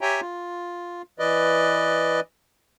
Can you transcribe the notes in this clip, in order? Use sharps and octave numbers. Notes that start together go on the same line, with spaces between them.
G4 C#5 E5 G5 G#5 A#5
F4
E3 B4 D5 D#5